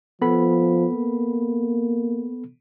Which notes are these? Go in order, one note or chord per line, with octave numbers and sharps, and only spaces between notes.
F3 B3 A4 B5
A#3